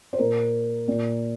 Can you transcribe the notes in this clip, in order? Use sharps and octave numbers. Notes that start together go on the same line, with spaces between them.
C5
A#2 A#4
A#2